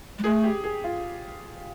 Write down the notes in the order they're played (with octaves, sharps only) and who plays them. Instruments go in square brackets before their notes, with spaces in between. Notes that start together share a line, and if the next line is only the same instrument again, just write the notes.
[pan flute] G#3
[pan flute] A3 [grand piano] G#4
[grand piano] G4
G#4
F4